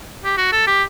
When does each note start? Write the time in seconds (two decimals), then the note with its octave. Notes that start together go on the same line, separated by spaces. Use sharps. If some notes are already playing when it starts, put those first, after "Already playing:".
0.25 G4
0.37 F#4
0.52 A4
0.67 G4